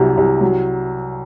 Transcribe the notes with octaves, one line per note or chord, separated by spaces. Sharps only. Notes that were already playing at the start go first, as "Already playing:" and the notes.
Already playing: C2 C3 F#3
C2
F#3